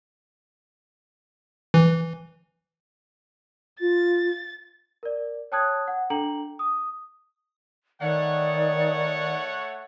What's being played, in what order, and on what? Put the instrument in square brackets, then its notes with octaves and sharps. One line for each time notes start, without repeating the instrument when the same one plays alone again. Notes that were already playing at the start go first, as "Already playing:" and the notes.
[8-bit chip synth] E3
[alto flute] F4 [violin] A6
[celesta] A#4 D5
C#5 G5 A5 D#6 F#6 G#6
F#5
D4 A4 G5 A#5 F#7
D#6
[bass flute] D#3 [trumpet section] A3 C#5 F#5 [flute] D5